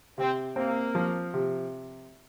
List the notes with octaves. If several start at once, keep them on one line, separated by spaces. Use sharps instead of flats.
C3 C4
A#3 C4
F3
C3